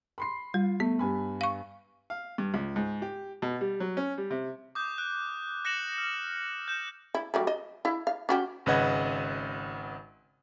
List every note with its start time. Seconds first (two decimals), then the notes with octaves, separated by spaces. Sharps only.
0.18 B5 C6 C7
0.54 G3 F4
0.80 A3 B3
0.99 G2 G#5 B5
1.41 F5 C#6
2.10 F5
2.38 G2
2.54 C#2
2.76 G#2
3.02 G4
3.42 B2
3.61 G3
3.80 F#3
3.97 C#4
4.18 G3
4.31 C3
4.75 D6 D#6 G6
4.98 F#6
5.65 F#6 A#6 C#7 E7 F#7
5.98 F6
6.68 G6 E7
7.15 E4
7.34 F#3 G3 A3
7.47 D#5
7.85 E4 F5
8.07 F5
8.29 C#4 F#4 G4
8.66 G#1 C#3 B4 D#5 F#5 G#6